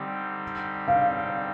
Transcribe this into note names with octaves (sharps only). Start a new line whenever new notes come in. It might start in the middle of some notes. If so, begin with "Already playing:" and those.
Already playing: D3 G3 C4 D#4 G4
F5